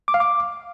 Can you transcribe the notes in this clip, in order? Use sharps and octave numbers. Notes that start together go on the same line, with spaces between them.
D6
F5
D6